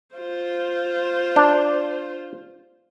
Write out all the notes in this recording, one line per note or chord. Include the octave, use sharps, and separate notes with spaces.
F4 C5
D4